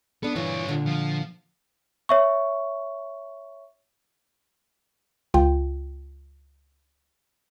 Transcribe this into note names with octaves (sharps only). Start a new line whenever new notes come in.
B3 D4 A4
G2 A#2 E3 F4 C#5
A#2 D3
F3
C#5 E5 C#6
C#2 F4 G5